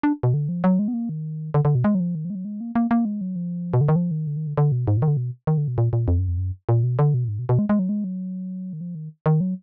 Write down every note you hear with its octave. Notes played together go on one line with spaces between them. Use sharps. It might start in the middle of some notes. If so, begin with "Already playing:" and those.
D4
B2
D3
F3
F#3
G#3
B3
A#3
D#3
D3
D3
B2
G#3
F#3
F3
D#3
F3
G#3
F#3
G#3
A#3
A#3
A#3
G#3
F#3
F3
B2
D3
D#3
F3
D#3
D3
D#3
D3
D3
B2
G#2
A#2
D#3
D3
B2
D#3
D3
B2
A#2
A#2
F2
F#2
F2
F#2
A#2
B2
D3
B2
A#2
G#2
B2
B2
G#3
G#3
F#3
G#3
F#3
D#3
F3
D#3
D#3
F#3